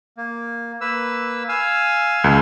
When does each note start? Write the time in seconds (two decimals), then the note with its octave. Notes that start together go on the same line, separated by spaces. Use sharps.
0.17 A#3
0.81 A#3 B4 E6
1.49 F5 G#5 E6
2.24 C#2